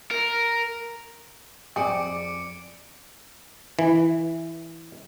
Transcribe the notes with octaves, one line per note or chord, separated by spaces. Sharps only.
A#4
F2 C4 G#4 D5 D6 C#7 D7
E3